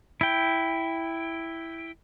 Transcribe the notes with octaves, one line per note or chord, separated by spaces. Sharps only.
E4 G5